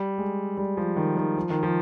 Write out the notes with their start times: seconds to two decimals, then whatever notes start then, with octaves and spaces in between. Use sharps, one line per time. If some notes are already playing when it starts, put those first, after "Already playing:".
Already playing: G3
0.18 G#3
0.58 G3
0.77 F3
0.97 D#3
1.17 D#3
1.37 F3
1.50 D#3
1.63 F3